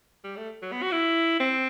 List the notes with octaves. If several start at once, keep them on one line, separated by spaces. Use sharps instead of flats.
G3
A3
F#3
B3
F#4
E4
C4